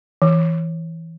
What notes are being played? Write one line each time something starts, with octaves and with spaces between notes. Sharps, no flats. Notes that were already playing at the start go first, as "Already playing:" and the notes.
E3